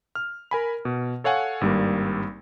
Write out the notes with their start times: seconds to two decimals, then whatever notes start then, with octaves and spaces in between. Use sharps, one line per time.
0.15 F6
0.51 A#4 G#5 B5
0.85 B2
1.24 A4 C#5 F5 F#5 G#5
1.61 G#1 G2 G3 A#3